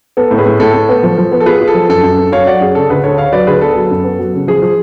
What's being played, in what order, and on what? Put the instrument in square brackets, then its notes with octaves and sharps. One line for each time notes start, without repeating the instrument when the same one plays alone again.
[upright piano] B3 [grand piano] A4
[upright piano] A2
[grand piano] G#4 B4
[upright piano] A2
[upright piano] A2 [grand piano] A4
[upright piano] A2
B3
F3
F3
B3
[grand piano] A4
[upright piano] F4 [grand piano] G#4 B4
[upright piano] F4
[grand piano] A4
[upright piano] F3
[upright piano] F#2 [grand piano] A4
[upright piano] F#2
F#2
[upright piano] F#2 [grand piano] C#5 F5
[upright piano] F#3 [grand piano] D5 F#5
[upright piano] F#2 [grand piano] G#4
[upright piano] C#3 [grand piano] A4
[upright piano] D2 [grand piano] G#4 B4
[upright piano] D2 [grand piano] A4 C#5
[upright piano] D2 [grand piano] C#5 F5
[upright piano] F#3 [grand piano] B4 D5
[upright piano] D2 [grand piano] G#4 B4
[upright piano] B3 [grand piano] A4
[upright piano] F#3
F#2
B3
F#3
C#3
[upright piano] F3 [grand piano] G#4
[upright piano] F3